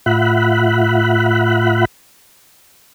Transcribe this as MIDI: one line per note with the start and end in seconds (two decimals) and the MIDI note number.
0.06 1.85 45
0.06 1.85 65
0.06 1.85 76
0.06 1.85 78
0.06 1.85 83
0.06 1.85 90